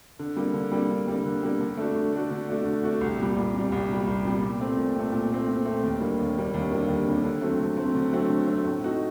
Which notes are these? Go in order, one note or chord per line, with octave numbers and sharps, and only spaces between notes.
D3
G3 A#3
D3
G3 A#3
D3
G3 A#3
D3
G3 A#3
D3
A3 D4 F#4
D3
A3 D4 F#4
D3
A3 D4 F#4
D3
A3 D4 F#4
C2
A#2 G3
C2
A#2 G3
C2
A#2 G3
C2
A#2 G3
A#2
A3 C4
A#2
A3 C4
A#2
A3 C4
A#2
A3 C4
D#2
D3 G3 A#3
D#2
D3 G3 A#3
D#2
D3 G3 A#3
D#2
D3 G3 A#3
D3
F#3 A3 C4
D3
F#3 A3 C4
D3
F#3 A3 C4
D3
F#3 A3 C4
A2
A3 D#4 F#4